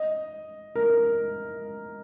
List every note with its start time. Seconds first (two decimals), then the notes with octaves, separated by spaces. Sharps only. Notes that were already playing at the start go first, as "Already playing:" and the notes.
Already playing: D#5
0.75 A#4